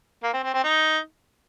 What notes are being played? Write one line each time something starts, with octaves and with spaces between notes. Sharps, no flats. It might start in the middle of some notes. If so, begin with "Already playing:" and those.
A#3
C4
C4
C4
D#4